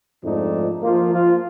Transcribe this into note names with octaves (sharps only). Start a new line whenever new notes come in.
F2 G#2 F3 A3 D4 D#4
F3 A#3 F4
F3 F4